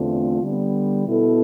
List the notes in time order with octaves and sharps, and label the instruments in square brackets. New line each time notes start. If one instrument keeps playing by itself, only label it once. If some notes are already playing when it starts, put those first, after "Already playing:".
Already playing: [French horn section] E2 D3 A3 C4 F4
D3 G3 B3
B2 B3 E4 A4